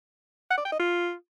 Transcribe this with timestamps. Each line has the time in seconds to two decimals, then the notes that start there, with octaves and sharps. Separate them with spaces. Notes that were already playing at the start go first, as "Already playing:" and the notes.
0.50 F#5
0.58 D5
0.65 G5
0.72 D#5
0.79 F4